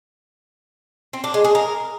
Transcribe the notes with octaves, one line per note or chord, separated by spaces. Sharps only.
C4
D4
G#3
G#4
A#4